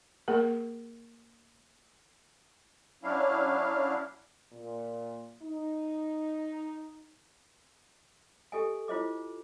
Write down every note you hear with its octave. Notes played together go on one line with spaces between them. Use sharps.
A#3 G#4 A#4
F#3 C#4 D4 E4 F5
A#2
D#4
G4 A4 D#5 G#5
E4 F4 C5 D#5 D6